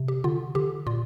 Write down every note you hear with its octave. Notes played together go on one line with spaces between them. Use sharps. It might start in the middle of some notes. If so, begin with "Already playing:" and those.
Already playing: C3
G4
D3 F4
D3 G4
A#2 F4